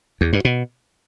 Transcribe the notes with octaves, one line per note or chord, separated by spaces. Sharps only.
E2
G2
B2